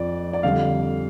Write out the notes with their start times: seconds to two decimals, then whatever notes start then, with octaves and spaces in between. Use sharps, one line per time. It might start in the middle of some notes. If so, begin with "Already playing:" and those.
Already playing: F2 F3 D5
0.33 D5
0.43 F2 D3 G3 F5